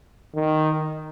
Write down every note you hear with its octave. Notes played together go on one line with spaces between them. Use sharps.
D#3